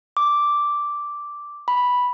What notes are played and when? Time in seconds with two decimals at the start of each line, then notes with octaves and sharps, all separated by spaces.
0.17 D6
1.68 B5